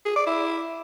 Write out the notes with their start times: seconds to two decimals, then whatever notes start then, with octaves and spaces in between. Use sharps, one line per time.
0.06 G#4
0.16 D5
0.27 E4